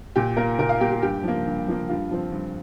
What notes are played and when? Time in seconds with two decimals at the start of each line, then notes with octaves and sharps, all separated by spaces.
0.16 A#2 G4
0.37 A#3 A#4
0.59 A#2 A#4
0.69 F5
0.80 A#3 G4
0.91 G4
1.02 G2 G4
1.24 F3 A#3
1.46 G2
1.68 F3 A#3
1.89 G2 F4
2.11 F3 C4
2.32 G2